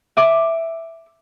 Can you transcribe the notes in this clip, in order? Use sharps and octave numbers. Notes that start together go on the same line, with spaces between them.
E5 D6